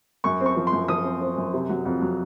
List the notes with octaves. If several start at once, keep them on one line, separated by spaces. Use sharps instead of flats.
F#2 C#6
C4
C#6
F3
C6
F#2
F3 D#6
C4
C4
F#2
C3
F#3
F2
F#3